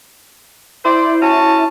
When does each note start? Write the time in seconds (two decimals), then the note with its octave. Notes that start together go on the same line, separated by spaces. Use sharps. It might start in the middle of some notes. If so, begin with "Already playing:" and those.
0.85 E4 C5 D5
1.21 C#4 F#4 A5